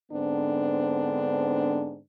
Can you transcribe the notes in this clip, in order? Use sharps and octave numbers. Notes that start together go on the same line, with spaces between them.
G#2 D3 B3 C4 D4